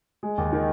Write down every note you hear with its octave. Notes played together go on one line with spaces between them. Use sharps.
G#3
D#2
D#3